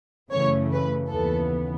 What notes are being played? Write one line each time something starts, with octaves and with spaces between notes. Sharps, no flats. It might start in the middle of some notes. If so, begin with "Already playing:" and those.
F#2 C#3 E3 A3 C#5
B4
D#2 C#3 E3 B3 A4